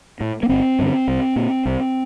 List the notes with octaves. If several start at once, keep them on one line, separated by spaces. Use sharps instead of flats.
A2
A#3
G1 C4
G2 D3
C2
A#2
C2